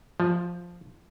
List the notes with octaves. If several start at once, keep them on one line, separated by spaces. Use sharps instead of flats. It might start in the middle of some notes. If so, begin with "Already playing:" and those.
F3